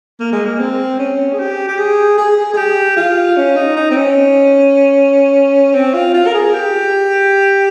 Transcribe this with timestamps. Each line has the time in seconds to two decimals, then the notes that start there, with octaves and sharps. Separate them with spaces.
0.20 A#3
0.32 G#3
0.45 A#3
0.59 C4
0.99 C#4
1.33 G#4
1.39 G4
1.68 G4
1.78 G#4
2.18 G#4
2.53 G#4
2.57 G4
2.96 F4
3.37 C#4
3.57 D#4
3.76 D#4
3.90 C4
3.96 C#4
5.74 C4
5.94 F4
6.14 F4
6.27 A#4
6.34 G#4
6.53 G4